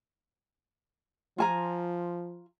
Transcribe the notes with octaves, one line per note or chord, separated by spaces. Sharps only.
F3 F4 G#5 A#5